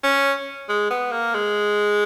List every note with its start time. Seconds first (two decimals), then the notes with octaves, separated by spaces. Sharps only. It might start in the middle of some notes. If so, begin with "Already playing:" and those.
0.03 C#4
0.69 G#3
0.90 B3
1.12 A#3
1.34 G#3